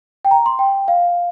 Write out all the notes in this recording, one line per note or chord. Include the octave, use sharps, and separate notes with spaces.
G5
A#5
C6
G5
F5